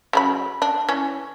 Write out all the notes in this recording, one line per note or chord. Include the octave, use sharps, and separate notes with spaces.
C#3 F#3 B5
D4
E3 C#4